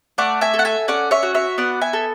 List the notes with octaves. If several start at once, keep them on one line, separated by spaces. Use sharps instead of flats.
A3 D5 F#5
E5 G#5
A4
F#5
E5 G#5
C#4 D5 F#5
C#5 E5
F#4
C#5 E5
B3 D5 F#5
E5 G#5
A4